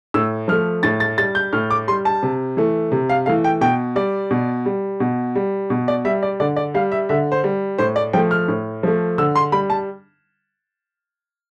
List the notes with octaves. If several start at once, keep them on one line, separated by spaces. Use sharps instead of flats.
A2 E6
F3 A3 F6
A2 A6
A6
G3 A6
G6
A2 F6
D6
G3 C6
A5
C3
E3 A3
C3
F5
E3 A3 F5
G5
B2 G5
G3 D5
B2
G3
B2
G3
B2
D5
G3 E5
D5
D3 D5
D5
G3 F5
E5
D3 E5
C5
G3
A2 C5
D5
F3 A3 G5
F6
A2
F3 A3
D3 E6
C6
G3 B5
A5